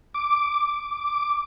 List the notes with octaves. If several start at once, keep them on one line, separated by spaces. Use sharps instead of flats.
D6